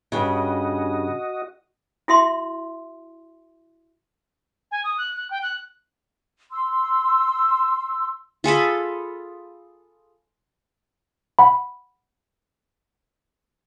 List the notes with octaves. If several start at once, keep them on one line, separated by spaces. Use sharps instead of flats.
G2 C#3 F#4 D#5
E4 F#4 E5 C6
G#5
D#6
F#6
F#6
G5
F#6
C6 E6
F4 G#4 A4 B5
F#5 B5